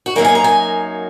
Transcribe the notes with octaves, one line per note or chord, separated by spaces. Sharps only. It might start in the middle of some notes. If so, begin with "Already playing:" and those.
F#4
F#2 F#3 A#3 D#4 G#4
G#5
A#5
G#5